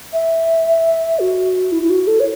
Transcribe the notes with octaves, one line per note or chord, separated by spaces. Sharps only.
E5
F#4
E4
E4
F#4
A4
C#5